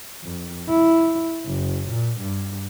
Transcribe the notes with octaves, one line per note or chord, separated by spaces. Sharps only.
F2
E4
F#1
A#2
G2